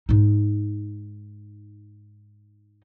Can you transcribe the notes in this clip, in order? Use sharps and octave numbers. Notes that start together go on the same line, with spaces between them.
G#2 D#4